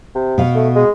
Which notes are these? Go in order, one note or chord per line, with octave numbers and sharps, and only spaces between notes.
C3
B2 F5
A3
G#3